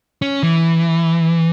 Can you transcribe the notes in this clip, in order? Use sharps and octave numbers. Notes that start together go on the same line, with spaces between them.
C#4
E3